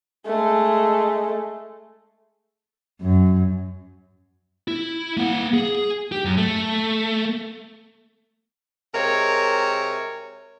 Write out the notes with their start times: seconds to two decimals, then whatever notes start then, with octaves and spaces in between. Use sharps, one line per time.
0.26 G#3 A3
3.01 F#2
4.68 E4
5.17 A#3 F#5
5.54 G#4
6.12 G4
6.25 F#2
6.37 A3
8.94 C3 G#3 A#4 C#5